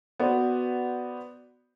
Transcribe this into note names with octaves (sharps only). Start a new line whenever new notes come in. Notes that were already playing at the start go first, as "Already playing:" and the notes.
B3 F#4 B4 C5 D5